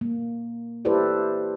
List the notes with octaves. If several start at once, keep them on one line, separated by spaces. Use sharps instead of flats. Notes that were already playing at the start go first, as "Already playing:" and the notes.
A#3
E4 G4 A4 B4 C5 D5